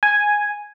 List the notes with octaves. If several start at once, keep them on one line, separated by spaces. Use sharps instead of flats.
G#5